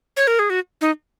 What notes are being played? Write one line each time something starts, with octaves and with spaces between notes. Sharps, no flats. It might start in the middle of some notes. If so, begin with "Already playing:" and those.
C#5
A#4
G#4
F#4
D#4